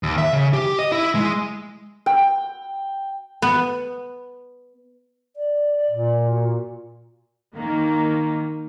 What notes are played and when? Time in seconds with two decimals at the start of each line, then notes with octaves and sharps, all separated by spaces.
0.03 D#2
0.18 E5
0.33 C#3
0.54 G4
0.79 D#5
0.92 E4
1.15 G#3
2.06 G5
3.42 B3
5.36 D5
5.90 A#2
6.30 F#4
7.55 D#3 A#3